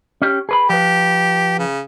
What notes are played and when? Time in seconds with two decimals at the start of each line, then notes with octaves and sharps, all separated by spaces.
0.22 C#4 G4
0.49 G#4 B4 B5
0.70 F3 G4 B4
1.59 C#3